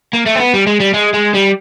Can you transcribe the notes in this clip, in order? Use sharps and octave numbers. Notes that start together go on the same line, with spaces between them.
A#3
A3
C4
B3
G3
G#3
G3
G#3
G#3
G3